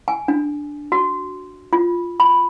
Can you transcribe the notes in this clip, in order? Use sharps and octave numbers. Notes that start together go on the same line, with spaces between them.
G#5
D4
F#4
F4
B5